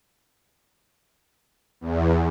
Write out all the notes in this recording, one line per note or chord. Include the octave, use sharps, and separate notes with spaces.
E2